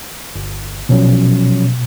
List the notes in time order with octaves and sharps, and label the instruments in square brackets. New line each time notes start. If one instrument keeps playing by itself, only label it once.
[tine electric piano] G1
[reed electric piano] B2 [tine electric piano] F3 F#3 C#4